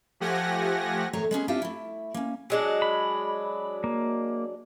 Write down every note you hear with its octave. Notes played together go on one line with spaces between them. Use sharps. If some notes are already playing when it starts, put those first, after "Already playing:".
F3 A3 G4 F#5 G#5 A#6
E2 A2 A3 A#4 C#5 A#5
G#3 B3 C#4 G#4
C4 D4 E4 F4 G4 F5
A3 E4
A#3 C#4
F#3 G#3 D4
B5
A#3